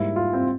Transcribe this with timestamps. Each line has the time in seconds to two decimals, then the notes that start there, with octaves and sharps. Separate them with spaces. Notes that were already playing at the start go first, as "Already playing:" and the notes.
Already playing: G#2 G3 A#3 E4
0.16 F4
0.33 C4